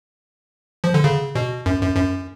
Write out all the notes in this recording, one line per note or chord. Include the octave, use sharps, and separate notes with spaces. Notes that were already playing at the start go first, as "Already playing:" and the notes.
F3
D3
C#3
B2
F#2
F#2
F#2